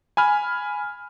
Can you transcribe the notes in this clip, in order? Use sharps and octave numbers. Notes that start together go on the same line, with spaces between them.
G#5 B5 F6